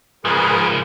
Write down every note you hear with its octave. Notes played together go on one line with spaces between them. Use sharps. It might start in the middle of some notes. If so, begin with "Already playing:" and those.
G#2 F3 G#4 A#4 B4